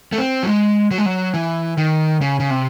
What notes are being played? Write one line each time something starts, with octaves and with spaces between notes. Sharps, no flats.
A3
C4
F#3
G#3
F#3
G#3
F#3
E3
D#3
C#3
C#3
C3